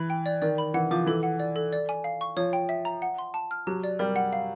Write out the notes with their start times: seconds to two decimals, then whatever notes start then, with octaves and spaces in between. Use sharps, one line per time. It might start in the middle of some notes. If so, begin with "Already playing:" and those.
Already playing: E3 B5
0.10 G5
0.26 D5
0.42 D#3 D5
0.58 B5
0.74 E3 F#5
0.91 F3 D6
1.06 E3 A4
1.23 F#5
1.40 D5
1.56 A4
1.73 D5
1.89 G#5
2.04 F5
2.21 C#6
2.36 F3 C#5
2.53 G5
2.69 E5
2.85 A#5
3.02 F#5
3.18 C6
3.34 A5
3.51 F6
3.67 F#3 G4
3.84 D5
3.99 G3 A#4
4.16 F#5
4.33 F5